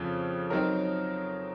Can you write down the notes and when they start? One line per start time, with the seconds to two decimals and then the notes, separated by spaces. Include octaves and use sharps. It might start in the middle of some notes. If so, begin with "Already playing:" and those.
Already playing: F2 C#3 F3
0.50 F#3 C4 D#4 A#4 C#5